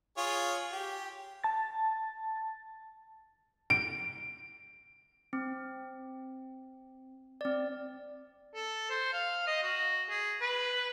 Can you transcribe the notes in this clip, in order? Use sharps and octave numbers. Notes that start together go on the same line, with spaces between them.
F4 G#4 C#5
G4
A5 A6
D7
C4
C4 D5
A4
C5
F5
D#5
F#4
G#4
B4